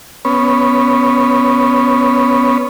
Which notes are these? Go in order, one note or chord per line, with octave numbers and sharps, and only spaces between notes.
B3 C#4